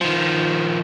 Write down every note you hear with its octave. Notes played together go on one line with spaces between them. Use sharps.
D#3 F3